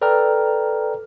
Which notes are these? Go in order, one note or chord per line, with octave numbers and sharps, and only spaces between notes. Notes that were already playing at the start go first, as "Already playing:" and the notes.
A4 B4 D5 G5 A#5 F6